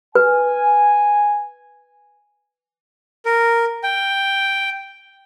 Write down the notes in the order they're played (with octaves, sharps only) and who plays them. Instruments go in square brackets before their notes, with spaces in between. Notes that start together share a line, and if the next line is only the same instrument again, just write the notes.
[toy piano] B4 [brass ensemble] G#5
[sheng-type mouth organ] A#4
G5